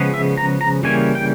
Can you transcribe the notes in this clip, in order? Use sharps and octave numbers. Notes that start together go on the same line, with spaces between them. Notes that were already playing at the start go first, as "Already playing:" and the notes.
Already playing: C#3 F3 G#3 B3
E5
A#5
A#5
C#3 E3 G3 A#3 C#4 G#5
G5